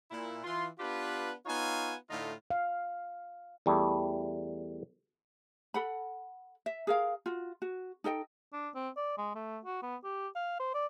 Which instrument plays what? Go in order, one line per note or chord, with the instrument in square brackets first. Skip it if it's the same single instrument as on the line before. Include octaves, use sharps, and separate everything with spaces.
[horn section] A#2 E4
E3 F4 C6
B3 D4 F4 G4 B4
B3 D#4 F4 C#5 F5 G#5
A2 D3 A3 D#4 F4
[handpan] F5
[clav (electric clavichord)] E2 G3 A3
[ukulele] A4 F#5 B5
E5
G#4 A#4 F5
F4 F#4
F#4
D#4 A4 D#5 G5
[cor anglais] D4
C4
D5
G#3
A3
F#4
B3
G4
F5
C5
D5